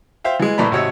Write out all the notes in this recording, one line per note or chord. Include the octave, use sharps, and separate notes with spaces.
C5 E5 F5 G5
E3 G#3
A#1 E3 A3 D5 A#5 B5
G#1 C3 F#4 C#5 D#5 E6